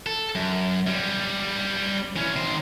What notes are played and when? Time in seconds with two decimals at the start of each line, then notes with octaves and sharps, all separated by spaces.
0.06 A4
0.35 F#2
0.87 G3 C#4
2.16 E3 C#4
2.36 D#3 C5